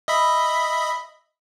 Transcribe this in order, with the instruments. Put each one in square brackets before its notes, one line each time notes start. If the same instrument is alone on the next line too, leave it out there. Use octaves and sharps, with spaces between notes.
[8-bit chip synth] D#5 E5 B5